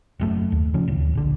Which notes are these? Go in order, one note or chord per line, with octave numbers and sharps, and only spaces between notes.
F#1 F#2 A3
D#2
C#3 F3 C#4
D1 D#2
A#1 D3